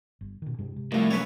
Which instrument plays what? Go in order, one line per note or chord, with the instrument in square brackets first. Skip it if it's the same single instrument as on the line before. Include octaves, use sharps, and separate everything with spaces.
[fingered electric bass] G1
B2 D#3
G2 C3 G#3
C3
[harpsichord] C2 F3 [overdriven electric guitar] A2 A3
[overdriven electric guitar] F#2 A#2 [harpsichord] B4 C#5